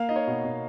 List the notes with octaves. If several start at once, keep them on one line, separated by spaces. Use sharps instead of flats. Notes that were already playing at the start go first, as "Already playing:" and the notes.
Already playing: A#3 F5
D#4 D#5
C#5
B2
B2